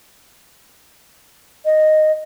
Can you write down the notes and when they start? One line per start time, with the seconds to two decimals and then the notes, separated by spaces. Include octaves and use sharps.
1.65 D#5